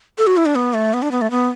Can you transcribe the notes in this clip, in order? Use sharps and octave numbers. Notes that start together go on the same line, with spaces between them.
A4
F#4
E4
D4
B3
A3
B3
D4
B3
A3
B3